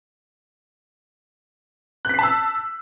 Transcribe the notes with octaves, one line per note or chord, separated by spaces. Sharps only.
A5 E6 F#6 B6 C7